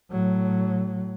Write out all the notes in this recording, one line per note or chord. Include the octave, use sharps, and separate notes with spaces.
A2 F#3